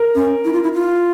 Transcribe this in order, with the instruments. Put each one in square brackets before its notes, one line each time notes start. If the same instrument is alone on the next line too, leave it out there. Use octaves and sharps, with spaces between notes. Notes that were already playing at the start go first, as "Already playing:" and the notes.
Already playing: [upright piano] A#4
[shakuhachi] C#4
E4
F4
E4
F4